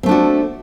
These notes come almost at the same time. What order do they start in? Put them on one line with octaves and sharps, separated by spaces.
C4 A3 D4 F#4